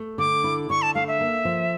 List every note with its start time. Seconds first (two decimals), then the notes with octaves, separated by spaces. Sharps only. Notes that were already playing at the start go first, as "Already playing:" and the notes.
Already playing: A3
0.18 D3 D6
0.44 E4
0.70 D3 C#6
0.82 A5
0.95 A3 F5
1.08 E5
1.21 A#3
1.45 F3